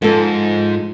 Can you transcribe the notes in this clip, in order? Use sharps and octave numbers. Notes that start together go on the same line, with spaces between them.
G#2 F3 A4